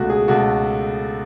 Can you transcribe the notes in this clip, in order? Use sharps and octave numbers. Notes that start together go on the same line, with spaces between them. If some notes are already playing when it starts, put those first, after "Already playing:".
Already playing: C#2 B2 A3 F#4
G#4
C#2 B2 A3 F#4 A4